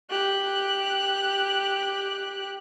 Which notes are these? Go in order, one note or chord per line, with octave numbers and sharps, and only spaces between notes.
G4 F#6